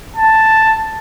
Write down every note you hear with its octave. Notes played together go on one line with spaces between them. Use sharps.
A5